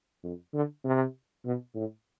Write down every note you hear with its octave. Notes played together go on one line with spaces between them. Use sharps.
F2
D3
C3
B2
A2